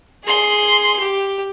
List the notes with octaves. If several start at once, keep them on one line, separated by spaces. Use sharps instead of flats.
G#4 C6
G4